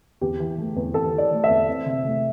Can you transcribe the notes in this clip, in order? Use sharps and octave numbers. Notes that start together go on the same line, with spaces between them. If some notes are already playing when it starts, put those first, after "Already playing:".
E2 G4
E3
A3
E2
E2 A4
E3
D5
A3
E5
E2
C4
C3
A3